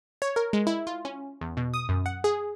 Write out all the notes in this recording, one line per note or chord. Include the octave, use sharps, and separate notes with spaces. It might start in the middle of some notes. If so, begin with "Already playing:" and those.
C#5
A#4
G#3
E4
F4
C#4
E2
B2
D#6
F#2
F#5
G#4